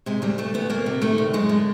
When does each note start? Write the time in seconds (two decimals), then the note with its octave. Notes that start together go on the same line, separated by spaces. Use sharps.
0.06 C3 G#3
0.22 D2 G3
0.38 D2 A3
0.54 D2 B3
0.70 D2 A#3
0.86 C3
1.02 D#3 A3
1.18 D2
1.33 F#2 G#3
1.49 D3